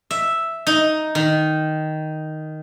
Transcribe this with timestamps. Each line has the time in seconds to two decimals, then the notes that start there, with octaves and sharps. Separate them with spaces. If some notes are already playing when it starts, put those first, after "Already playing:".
0.11 E5
0.67 D#4
1.15 D#3